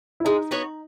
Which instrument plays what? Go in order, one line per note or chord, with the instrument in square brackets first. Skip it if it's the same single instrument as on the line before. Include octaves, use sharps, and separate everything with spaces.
[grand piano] E4
[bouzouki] G#3 [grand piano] D#4
[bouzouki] B3 F#4 C#5